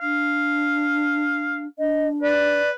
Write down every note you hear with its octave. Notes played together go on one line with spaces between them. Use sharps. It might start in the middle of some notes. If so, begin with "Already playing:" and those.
D4 F5
D4 D#5
B4 D5